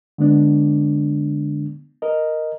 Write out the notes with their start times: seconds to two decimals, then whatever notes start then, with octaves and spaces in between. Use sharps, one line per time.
0.18 D3 G#3 B3 D4
2.02 A#4 D#5